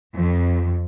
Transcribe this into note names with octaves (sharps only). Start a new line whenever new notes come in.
F2